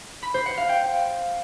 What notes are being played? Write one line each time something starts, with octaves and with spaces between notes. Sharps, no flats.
B5
C5
F#5
F5
G5